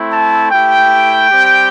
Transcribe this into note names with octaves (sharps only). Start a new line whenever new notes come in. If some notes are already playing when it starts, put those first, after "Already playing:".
Already playing: A3 C4 E4
A5
A3 E4 G4 G5
G3 C4 G4